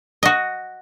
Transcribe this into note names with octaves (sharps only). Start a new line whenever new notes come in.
F#4 D#5